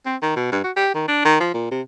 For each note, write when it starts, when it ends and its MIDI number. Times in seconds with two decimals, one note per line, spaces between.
0.06 0.16 60
0.22 0.33 51
0.36 0.50 47
0.51 0.60 43
0.64 0.72 66
0.76 0.91 67
0.95 1.06 51
1.08 1.20 62
1.25 1.38 51
1.40 1.52 53
1.54 1.71 46
1.71 1.81 48